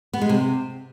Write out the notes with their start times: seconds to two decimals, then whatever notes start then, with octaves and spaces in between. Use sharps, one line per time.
0.13 B3
0.21 G#3
0.29 C3